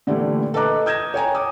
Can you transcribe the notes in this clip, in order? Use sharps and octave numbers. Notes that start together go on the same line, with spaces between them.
A#2 D3 E3 A3 E4 G4
A4 B4 D#5 A#5 D6 F#6
D#6 G6 G#6 A#6 E7
C#5 G5 G#5 A#5
D6 D#6